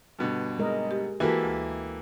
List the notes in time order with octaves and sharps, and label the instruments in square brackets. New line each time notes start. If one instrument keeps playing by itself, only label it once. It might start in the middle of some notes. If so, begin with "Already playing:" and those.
[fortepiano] G2 B2 D3
[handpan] G#3 A#4 D#5
[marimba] G4
[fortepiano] E3 A#3 G4 [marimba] F#4 A#4 [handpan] A4 E5
[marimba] D2